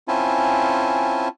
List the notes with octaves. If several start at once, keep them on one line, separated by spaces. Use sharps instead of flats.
C4 C#4 E4 F4 G#5 A5